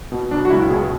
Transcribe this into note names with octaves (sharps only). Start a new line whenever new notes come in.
B2
F#3 D4
F#4
C#2 E4
B2 G#4